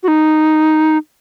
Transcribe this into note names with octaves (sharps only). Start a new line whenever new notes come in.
F#4
D#4